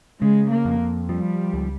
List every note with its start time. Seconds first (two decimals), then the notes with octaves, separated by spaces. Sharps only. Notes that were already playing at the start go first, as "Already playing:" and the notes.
0.22 C#3 G#3
0.51 A#3
0.65 F2
1.09 F3 G3
1.53 C#2